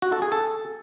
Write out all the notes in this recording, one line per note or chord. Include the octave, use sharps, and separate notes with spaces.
F#4
A4
G#4
A4